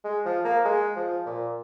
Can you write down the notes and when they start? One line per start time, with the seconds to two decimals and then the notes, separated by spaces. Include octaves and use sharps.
0.04 G#3
0.25 F3
0.45 A#3
0.65 G#3
0.96 F3
1.26 A#2